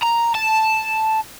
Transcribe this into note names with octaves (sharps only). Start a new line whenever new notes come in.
A#5
A5